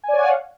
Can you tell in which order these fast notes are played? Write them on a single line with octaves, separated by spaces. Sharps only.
G#5 D5 C#5 F#5 F5